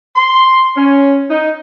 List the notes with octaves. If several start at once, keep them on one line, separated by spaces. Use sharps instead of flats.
C6
C#4
D#4